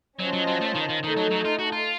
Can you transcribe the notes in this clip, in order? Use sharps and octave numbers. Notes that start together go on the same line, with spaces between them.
F#3 C#4 F4 C5 D#5 A5
F#3
F#3
A3
D#3
D#3
D#3 A3 D#4 A4
F#3
F#3
F4
F#4
F4